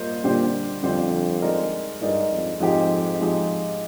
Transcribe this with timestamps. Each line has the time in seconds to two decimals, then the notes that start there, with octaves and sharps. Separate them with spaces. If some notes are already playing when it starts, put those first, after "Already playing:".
Already playing: G3 A#3 F4 C5 D#5
0.24 A#2 D3 G3 D4 G4 C5
0.83 F2 D3 G3 D4 G4 C5
1.42 G#3 D#4 A#4 D5
2.01 G2 G#3 D#4 A#4 D5
2.30 F2
2.60 F2 G#2 F3 G#3 D#4 G4
3.19 G#2 F3 G#3 D#4 G4